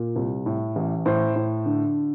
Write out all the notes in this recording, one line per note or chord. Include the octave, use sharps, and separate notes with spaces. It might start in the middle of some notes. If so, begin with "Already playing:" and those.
Already playing: A#2
C2
A2
A1
A2 C5
A2
D3